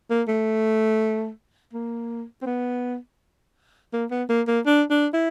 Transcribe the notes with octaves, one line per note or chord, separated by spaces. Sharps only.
A#3
A3
A#3
C4
B3
A#3
B3
A#3
A#3
D4
D4
E4